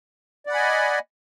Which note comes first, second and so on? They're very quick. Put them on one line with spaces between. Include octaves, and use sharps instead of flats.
D5 F#5 B5 G#5 D#5